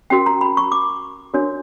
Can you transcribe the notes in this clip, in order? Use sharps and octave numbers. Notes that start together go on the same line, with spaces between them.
C#4 F#4 A#4 G5
A#5
B5
C#6
D6
D4 F#4 A#4 C#5